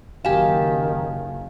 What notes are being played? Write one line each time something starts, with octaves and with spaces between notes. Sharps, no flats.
F#1 D#3 G4 F5 G#5 A5